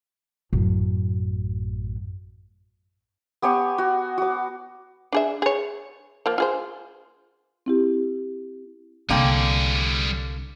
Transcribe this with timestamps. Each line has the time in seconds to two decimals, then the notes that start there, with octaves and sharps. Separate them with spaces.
0.53 A1 F#2
3.42 B3 G4 G#5 C#6
3.78 F#4
4.18 F#4 D6
5.13 D4 G#4 E5
5.42 G#4 C#5
6.26 F3 A#3
6.38 F4 G#4 C5
7.66 C4 E4 G4
9.10 C2 D3 G3 A#3 E4 G#4 G5